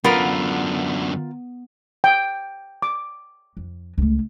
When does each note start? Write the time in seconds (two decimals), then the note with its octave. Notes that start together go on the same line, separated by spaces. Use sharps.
0.04 F#2 D3 B3 F4 A#4
2.04 G5
2.82 D6
3.57 F2
3.98 C#2 A3